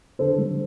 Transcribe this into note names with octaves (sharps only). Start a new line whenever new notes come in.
D3 A4 C5
G3